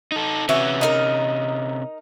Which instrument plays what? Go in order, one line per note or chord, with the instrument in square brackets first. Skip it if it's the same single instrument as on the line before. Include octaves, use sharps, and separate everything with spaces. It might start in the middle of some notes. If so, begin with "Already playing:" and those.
[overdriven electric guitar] D#4 A4
[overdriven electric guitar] C3 C#4 [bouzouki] E3 F#4
[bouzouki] D#4 E4 A#4